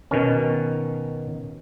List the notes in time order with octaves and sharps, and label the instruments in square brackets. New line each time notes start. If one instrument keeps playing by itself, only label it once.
[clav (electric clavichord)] B2 D#3 C#4